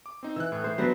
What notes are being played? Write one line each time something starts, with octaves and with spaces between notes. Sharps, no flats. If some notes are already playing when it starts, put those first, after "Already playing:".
D6
C4 D#4
E3 E6 F#6
A2
C5
F#3 B3 D4 F#4 C5